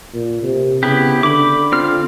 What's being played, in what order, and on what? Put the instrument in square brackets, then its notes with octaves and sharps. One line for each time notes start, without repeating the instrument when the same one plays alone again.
[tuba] A#2
C3
[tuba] C#3 [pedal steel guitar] B3 E4 G4
[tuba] D3 [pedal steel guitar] B5 D6
[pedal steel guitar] C4 F4 F6